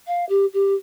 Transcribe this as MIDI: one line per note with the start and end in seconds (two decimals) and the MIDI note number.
0.07 0.25 77
0.29 0.45 67
0.53 0.74 67